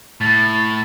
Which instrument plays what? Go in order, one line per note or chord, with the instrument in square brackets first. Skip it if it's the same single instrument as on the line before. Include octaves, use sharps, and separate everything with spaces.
[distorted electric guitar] A2 [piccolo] A6